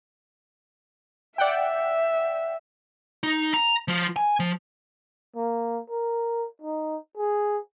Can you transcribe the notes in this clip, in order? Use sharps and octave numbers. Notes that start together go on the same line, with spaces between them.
D5 E5 F#5 G5
D#4
A#5
F3 F4
G#5
F3
A#3
A#4
D#4
G#4